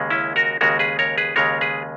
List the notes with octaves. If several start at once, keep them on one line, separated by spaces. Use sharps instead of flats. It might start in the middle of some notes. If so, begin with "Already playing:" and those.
Already playing: D#2 C#3 G#3
C#4 E4
F#4 A#4
D#2 C#3 G#3 F#4 A#4
G#4 B4
A#4 C#5
G#4 B4
D#2 C#3 G#3 A#4 C#5
G#4 B4